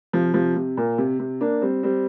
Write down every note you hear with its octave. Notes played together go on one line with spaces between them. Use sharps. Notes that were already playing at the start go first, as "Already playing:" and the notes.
C3 F3
C3 F3
C3
A#2
C3
C3
A#3 D4
G3 C4
G3 C4